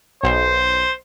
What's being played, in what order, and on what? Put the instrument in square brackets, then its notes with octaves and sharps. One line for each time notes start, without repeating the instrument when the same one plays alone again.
[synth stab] B1 [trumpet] C5